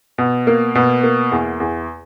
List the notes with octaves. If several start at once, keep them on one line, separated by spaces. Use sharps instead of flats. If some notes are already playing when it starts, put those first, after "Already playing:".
B2
A#3
B2
A#3
E2
E2